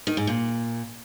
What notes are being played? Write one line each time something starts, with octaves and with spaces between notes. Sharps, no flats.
D#3
G#2
A#2